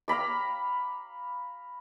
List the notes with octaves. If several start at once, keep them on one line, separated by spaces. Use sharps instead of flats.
F5 A#5 B5 D6